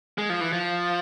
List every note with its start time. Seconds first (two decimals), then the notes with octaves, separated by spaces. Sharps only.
0.18 G#3
0.30 F3
0.41 E3
0.53 F3